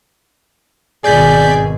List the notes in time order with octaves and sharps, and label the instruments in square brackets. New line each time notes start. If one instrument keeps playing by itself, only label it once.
[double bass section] G#1 B2 [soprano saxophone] G#4 [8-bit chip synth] D5 G6 B6